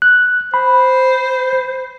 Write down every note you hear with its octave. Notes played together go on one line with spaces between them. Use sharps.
F#6
C5 B5